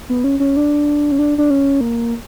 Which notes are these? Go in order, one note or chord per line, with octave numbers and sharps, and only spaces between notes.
B3
C#4
C#4
D4
C#4
D4
D4
C#4
A#3